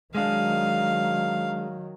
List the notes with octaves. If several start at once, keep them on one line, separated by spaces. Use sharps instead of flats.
D#3 F#3 G#3 D4 F5